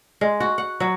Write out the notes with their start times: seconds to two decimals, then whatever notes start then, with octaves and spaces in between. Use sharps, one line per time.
0.21 G#3
0.40 F#4
0.58 F#5
0.80 F#3